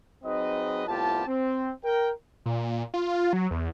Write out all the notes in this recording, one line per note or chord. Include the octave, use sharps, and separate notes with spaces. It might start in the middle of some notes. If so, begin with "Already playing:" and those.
F#3 C4 D#4 G#4 B4 D#5
C2 A2 B3 F4 G4 A5
C4
A#4 G5
A#2
F4
F#3
E2